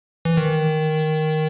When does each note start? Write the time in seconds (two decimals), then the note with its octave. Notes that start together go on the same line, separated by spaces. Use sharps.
0.25 E3
0.37 D#3